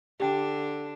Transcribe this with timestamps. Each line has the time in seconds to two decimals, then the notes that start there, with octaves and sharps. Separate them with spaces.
0.20 D3 D4 G4 G5